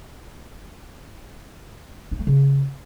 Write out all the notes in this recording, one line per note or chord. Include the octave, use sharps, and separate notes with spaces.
D#4
A3
C#3